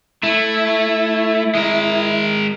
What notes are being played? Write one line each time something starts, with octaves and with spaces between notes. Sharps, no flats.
A3 E4
G#3 A#4